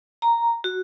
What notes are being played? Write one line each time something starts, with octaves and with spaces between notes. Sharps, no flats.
A#5
F#4